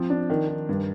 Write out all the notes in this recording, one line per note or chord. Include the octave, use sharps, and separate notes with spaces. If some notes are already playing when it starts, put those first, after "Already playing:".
Already playing: F3 C4
D4
D#3
D#3
G2